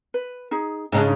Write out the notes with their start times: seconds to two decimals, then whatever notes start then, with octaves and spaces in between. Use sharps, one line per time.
0.14 B4
0.51 D#4 G#4
0.92 G#2 C#3 D4 D#4 D#5